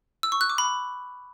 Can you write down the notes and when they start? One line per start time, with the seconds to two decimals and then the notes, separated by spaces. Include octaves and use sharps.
0.23 E6
0.32 C#6
0.41 F#6
0.50 D6
0.58 B5